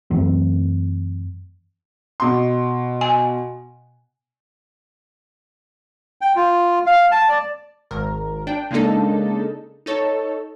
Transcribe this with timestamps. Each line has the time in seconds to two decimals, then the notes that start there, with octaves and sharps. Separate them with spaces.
0.10 F#2 E3 A3 C4
2.20 B2 C6
3.01 G#5
6.21 G5
6.36 F4
6.86 F5
7.11 A5
7.29 D5
7.91 G#1 A#4
8.47 D4 G5
8.71 C#3 G#3 A#3 D4 D#4 A4
9.86 D#4 A4 C#5